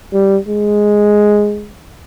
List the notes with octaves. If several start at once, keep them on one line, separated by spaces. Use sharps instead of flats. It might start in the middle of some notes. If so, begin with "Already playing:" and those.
G3
G#3